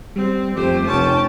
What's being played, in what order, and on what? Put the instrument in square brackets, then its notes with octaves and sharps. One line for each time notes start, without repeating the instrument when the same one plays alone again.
[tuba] G3 [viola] C4
[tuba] F2 [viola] A3 C5 [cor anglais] G4
[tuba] F1 [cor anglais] C#4 [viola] G5 A5